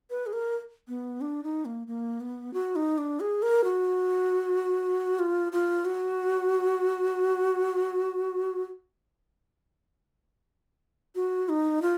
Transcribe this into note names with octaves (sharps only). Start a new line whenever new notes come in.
B4
G#4
A#4
B3
D4
D#4
A#3
A#3
B3
F#4
D#4
D4
G#4
A#4
F#4
F4
F4
F#4
F#4
D#4
F4